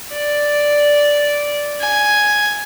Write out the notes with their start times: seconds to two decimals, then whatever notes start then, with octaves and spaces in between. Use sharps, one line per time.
0.12 D5
1.81 G#5